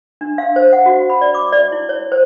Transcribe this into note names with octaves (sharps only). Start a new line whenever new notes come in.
D4
F5
C5
F#5
F#4
B5
D5
D6
D5
E4
C#5
C5